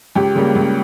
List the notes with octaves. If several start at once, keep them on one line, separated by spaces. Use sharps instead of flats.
C#2 G4
C#3 G3 A#3
C#2